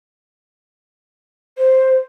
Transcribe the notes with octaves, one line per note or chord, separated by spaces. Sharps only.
C5